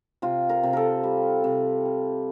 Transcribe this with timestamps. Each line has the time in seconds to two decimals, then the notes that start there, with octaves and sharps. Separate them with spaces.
0.22 C3 F4
0.49 A#4
0.63 C3
0.73 A4 A#4
1.03 G3
1.44 C3
1.85 G3